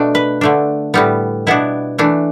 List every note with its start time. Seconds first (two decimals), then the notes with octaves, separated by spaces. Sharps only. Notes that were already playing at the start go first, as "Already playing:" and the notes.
Already playing: B2 A3 D4 D5
0.15 B4
0.41 D3 A3 D4
0.94 A2 G3 B3
1.47 B2 B3 D4 E4
1.98 E3 A3 D4